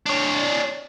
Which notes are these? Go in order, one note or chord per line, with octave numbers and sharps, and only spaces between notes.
D4 C#5